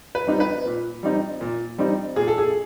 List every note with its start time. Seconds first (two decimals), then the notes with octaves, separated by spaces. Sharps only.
0.15 B4
0.27 G3 C4 D#4
0.40 B4
0.66 A#2
1.03 G3 C4 D#4
1.41 A#2
1.78 G3 C4 D#4
2.16 A#2 G#4
2.28 A4
2.38 G#4